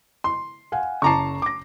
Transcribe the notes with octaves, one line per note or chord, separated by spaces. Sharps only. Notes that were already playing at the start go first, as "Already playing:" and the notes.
C6
F5 F#5 G#5
F#1 A5 A#5 C#6 D6 C7
D6 A#6